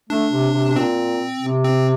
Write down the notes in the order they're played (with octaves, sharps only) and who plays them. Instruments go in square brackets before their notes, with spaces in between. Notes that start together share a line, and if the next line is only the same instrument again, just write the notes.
[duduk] A3 [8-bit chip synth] D4
[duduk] C3
C3
C3
[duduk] A#2 [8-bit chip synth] C4
[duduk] C3
[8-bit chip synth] C4